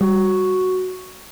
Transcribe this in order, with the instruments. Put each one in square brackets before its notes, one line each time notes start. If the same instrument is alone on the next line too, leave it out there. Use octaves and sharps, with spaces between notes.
[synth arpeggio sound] G3 [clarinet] F#4